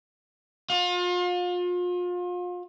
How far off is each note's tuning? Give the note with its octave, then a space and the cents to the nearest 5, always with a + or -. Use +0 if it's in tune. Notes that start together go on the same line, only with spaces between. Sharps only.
F4 +35